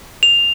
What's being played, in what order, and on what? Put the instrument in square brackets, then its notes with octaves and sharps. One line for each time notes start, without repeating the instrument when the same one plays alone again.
[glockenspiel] F7